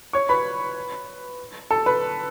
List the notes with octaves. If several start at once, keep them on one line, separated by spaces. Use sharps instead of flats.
C#5 C#6
B4 B5
A4 A5
B4 B5